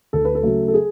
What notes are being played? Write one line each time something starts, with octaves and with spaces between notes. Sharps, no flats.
D2 A4
B4
A4
C#3 F#3 A3
A4
G#4